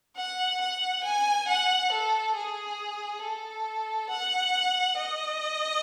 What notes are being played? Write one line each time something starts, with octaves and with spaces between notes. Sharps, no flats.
F#5
F#5
G#5
F#5
A4
G#4
A4
F#5
D#5